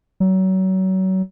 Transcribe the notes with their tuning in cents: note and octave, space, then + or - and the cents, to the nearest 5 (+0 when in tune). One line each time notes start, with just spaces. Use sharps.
F#3 +30